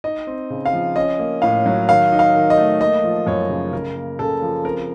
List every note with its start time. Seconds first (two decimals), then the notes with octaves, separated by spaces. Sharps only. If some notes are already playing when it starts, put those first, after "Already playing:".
0.04 D#4 D#5
0.27 C4
0.50 C#3
0.65 F5
0.73 F3
0.96 C#4 D#5
1.19 A#3
1.42 A2 F5
1.66 F#3
1.88 D#3 F5
2.12 D#4
2.19 F5
2.35 D#3
2.50 D#5
2.57 A3
2.81 A#3 D#5
3.04 F3
3.27 F#2 C#5
3.49 C#3
3.73 C#3 A#4
3.96 A#3
4.19 C#3 A4
4.42 F3
4.64 C4 A#4